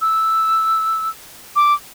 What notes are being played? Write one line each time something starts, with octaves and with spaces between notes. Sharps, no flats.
E6
D6